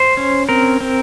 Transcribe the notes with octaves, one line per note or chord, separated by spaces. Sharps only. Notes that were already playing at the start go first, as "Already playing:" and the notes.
Already playing: C5
C#4
C4 A#4
C4